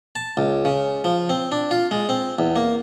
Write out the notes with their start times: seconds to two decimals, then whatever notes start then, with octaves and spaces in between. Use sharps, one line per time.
0.16 A5
0.37 C#2
0.65 C#3
1.04 F3
1.29 C4
1.52 D4
1.71 F4
1.91 G#3
2.09 C4
2.39 E2
2.56 A#3